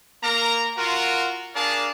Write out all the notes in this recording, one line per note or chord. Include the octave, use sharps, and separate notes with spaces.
A#3 A#4 A#5
F4 F#4 A#4
D4 G#4 A#4 D5 F5 A5